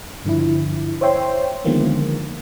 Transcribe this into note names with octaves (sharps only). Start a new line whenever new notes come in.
G2 D3 F3 E4
C5 C#5 E5 G5 C6
D3 D#3 F3 G#3 A#3 B3